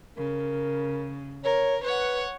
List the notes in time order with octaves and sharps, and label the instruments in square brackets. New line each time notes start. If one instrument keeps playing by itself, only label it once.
[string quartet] C#3 [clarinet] A#4
[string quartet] A#4 [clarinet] C#5
[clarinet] B4 [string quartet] C#5 F#5